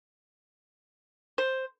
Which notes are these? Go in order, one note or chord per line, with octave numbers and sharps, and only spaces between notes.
C5